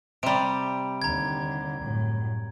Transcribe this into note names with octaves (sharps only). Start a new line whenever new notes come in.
C3 G3 A#5 D7
D#2 D3 A#5 G#6
F#2 A2